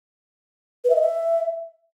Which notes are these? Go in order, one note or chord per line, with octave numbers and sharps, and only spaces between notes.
B4
E5
D#5
E5